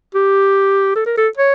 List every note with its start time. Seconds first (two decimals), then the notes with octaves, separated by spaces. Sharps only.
0.15 G4
0.96 A4
1.06 A#4
1.17 A4
1.37 C#5